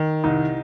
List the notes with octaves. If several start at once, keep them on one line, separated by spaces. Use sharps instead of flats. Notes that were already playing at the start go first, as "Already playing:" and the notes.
Already playing: D#3
C2 D#4